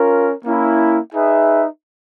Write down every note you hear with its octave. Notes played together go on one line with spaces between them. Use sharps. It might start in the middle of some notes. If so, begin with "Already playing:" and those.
Already playing: C#4 F4 A#4
A#3 C#4 E4
D#4 G#4 B4 E5